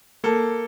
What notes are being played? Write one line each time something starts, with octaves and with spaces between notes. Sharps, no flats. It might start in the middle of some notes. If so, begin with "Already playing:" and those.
A#3 A4